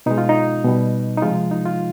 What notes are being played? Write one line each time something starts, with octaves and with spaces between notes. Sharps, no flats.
B2 G#3 D#4
F4
D#4
B2 G3
D#4
C3 F3 G#3 F4
D#4
F4